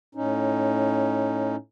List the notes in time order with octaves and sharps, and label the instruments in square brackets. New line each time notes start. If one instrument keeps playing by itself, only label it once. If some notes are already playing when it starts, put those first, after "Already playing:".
[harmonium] A2 C#4 D#4